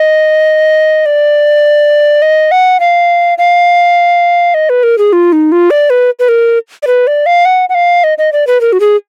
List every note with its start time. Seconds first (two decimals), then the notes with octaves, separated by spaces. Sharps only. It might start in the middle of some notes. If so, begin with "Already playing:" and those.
Already playing: D#5
1.06 D5
2.22 D#5
2.51 F#5
2.80 F5
3.38 F5
4.54 D#5
4.70 B4
4.83 A#4
4.98 G#4
5.13 F4
5.32 D#4
5.52 F4
5.70 D5
5.90 B4
6.19 B4
6.29 A#4
6.83 D5
6.87 B4
7.07 D5
7.26 F5
7.45 F#5
7.69 F#5
7.75 F5
8.04 D#5
8.18 D#5
8.33 D5
8.47 B4
8.61 A#4
8.73 F#4
8.80 G#4